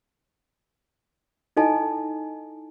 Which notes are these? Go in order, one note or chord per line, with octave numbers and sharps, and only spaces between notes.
D#4 E4 A4 D#5 G#5 A5